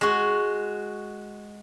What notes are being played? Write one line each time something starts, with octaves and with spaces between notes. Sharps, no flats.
G#3 F#4